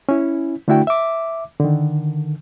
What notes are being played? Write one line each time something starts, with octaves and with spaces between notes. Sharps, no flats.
C#4 E4
D3 A3 D4 E4 F#4 G5
E5 D6
D3 D#3